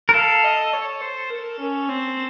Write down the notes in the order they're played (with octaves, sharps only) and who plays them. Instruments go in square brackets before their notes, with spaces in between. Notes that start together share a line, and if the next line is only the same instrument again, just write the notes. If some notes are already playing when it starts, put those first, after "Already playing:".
[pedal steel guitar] A#4
[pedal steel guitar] A4 [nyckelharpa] F5
[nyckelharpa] D#5
C#5
C5
A#4
C#4
C4